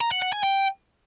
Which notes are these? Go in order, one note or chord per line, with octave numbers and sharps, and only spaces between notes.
A#5
F#5
F#5
G#5
G5